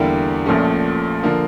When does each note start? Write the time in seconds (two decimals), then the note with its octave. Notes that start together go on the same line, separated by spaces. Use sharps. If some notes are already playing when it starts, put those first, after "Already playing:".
Already playing: E2 D3 G3 A#3 E4
0.45 A#1 A#2 F3 A3 C#4
1.23 D3 F3 A#3